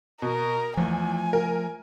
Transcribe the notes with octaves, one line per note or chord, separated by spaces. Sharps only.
B2 A#4
E2 F3 A3 G#5
A#4